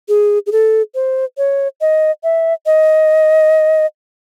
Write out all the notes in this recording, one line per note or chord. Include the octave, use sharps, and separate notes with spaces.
G#4
G#4
A4
C5
C#5
D#5
E5
D#5